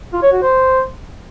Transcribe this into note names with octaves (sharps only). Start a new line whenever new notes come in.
F4
C#5
F#4
C5